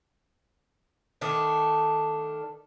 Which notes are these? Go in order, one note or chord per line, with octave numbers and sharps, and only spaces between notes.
D#3 A3 D4